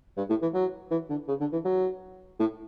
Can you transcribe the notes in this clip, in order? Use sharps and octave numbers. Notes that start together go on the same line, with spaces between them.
G2
A2
E3
F#3
E3
D3
C#3
D3
E3
F#3
A2